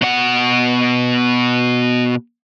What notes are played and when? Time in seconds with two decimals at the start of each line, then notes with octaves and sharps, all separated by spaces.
0.02 B2 F#5